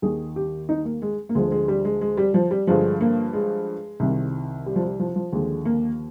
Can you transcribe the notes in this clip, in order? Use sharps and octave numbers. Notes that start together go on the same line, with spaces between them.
D#2 D#3 G#4
G4
D#4
A#3
G#3
A#3
D2 D3 F3 G#3
G#3
G3
G#3
G#3
G3
F3
G3
G2 D3 F3 G#3
A#3
G#3
C2 C3 D#3
G3
F3
G3
F3
F3
D#2 D3 F3 G#3
A#3